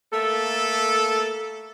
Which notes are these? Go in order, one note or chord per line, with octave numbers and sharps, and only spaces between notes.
A3 A#3 A4